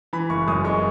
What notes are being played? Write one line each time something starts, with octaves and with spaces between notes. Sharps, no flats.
E3 B5
F#1 C#6
F#2 D#6
G#3 C#6